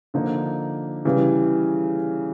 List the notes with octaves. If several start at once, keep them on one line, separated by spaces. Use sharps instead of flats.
D3 F3 A#3 D#4
C#3 E3 G3